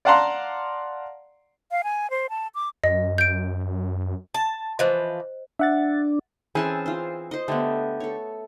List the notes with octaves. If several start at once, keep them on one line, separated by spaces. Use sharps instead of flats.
D5 F5 F#5 A5 A#5 C6
F5
G#5
C5
A5
D6
F#2 D#5
G6 D7
A5
E3 F3 C5 D#5
D4 E5 F#5 A6
E3 C4 C#4 G#4 A5 C6
F4 C5
C5 D#5
D3 A3 B3 G4
A4 C#5